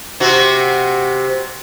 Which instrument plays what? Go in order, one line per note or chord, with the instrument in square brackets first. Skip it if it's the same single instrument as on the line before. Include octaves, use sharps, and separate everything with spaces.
[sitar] C3 C4 F#4